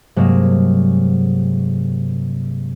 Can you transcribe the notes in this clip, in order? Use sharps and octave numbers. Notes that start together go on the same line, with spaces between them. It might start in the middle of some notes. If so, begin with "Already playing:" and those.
G2 C3 F#3 G#3 A#3